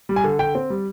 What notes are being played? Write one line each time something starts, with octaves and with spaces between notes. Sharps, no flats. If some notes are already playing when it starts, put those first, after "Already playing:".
G3
G#5
D3
D3 G5
C4
G3